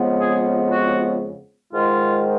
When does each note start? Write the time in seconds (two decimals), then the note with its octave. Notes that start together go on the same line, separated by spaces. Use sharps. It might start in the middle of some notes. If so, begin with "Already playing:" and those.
Already playing: F2 C#3 G#3 B3
0.21 G#4
0.72 F#4
1.73 G#2 D#3 G#3 F4